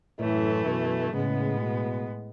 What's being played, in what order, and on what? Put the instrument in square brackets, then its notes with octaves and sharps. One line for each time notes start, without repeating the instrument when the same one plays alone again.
[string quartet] F#2 E3 A3 [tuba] A2
[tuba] B2
[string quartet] A2 G#3 B3 [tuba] C#3
[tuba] B2